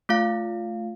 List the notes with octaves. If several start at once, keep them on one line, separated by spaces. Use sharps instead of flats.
A3 F4 F5